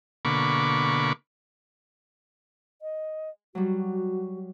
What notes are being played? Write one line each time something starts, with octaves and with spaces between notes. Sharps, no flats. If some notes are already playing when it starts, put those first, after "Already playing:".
B2 D3 A#3 B5 C#6 D6
D#5
F#3 G3 F#4